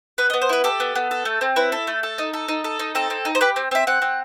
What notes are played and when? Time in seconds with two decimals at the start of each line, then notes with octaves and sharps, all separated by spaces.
0.18 B3 B4
0.30 D#5
0.34 B3
0.42 C5
0.49 E4 B4
0.64 G4 A4
0.80 B3
0.95 B3
1.11 A4
1.25 A3
1.41 C4
1.56 E4 B4
1.72 A4
1.87 A3
2.03 A4
2.18 D#4
2.33 A4
2.48 D#4
2.64 A4
2.79 D#4
2.95 C4 A4
3.10 C4
3.25 D#4
3.35 C5
3.41 G4 B4
3.56 C4
3.71 C4 E5
3.87 C4 F#5
4.02 C4